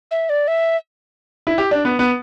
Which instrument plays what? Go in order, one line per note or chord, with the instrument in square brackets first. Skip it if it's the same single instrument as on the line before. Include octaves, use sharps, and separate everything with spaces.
[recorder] E5
D5
E5
[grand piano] E4
G4
D4
B3
B3